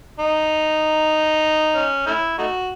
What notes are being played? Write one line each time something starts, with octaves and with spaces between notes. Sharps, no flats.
D#4
C#4
A3 C#4 E4
A3 D#4 F#4